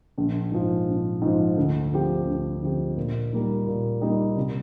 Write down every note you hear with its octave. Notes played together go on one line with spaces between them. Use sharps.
A#1
G#2 F3
A#1
G#2 F3
D2
D3 F3 C4 G4
D2
D3 F3 C4 G4
A#2
G3 A#3 D#4
A#2
G3 A#3 D#4
C2